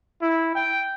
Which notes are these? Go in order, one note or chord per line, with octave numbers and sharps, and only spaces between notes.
E4
G5